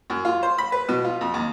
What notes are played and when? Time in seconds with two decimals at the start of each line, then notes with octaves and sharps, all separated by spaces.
0.10 F#2
0.25 F4
0.43 C5
0.58 B5
0.72 B4
0.89 B2
1.04 F4
1.21 F2
1.34 D#2